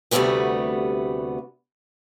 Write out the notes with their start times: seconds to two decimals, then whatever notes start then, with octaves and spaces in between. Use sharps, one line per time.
0.11 D2 C3 G3 A3 B3 F#4